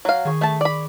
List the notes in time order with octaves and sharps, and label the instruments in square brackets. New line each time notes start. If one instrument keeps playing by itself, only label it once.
[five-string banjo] F#3 F5
[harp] D#3 G#4 C#6
[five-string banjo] A3 A5
D5 B5